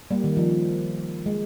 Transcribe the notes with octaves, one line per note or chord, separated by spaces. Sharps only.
G3 A#3
D#3
F3
G#3